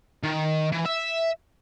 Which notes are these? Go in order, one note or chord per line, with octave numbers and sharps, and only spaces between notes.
D#3
E3
E5